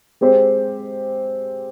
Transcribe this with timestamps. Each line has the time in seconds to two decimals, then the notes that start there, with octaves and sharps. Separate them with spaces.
0.21 G#3 C4 G4 C5